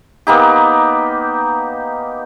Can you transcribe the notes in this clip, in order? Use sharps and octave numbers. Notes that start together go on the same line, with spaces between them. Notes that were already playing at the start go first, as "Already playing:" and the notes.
A#3 B3 D#4 G4